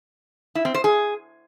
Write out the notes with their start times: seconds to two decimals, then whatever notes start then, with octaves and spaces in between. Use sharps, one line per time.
0.55 E4
0.65 C4
0.74 C5
0.84 G#4